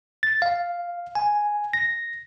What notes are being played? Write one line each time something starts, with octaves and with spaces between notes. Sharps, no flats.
A6
F5
G#5
A#6